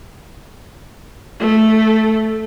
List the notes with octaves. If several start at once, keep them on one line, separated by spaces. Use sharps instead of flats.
A3 A4